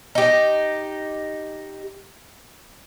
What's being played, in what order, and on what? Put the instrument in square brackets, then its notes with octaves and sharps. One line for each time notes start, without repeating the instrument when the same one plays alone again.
[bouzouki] D#4 G4